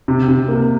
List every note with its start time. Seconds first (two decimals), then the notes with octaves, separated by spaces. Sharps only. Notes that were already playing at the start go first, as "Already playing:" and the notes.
0.08 C3
0.28 C3
0.48 A#3